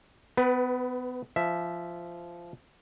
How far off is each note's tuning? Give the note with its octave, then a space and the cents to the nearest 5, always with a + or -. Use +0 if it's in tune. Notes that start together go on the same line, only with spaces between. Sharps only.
B3 +30 B4 +0
F3 -15 E5 +0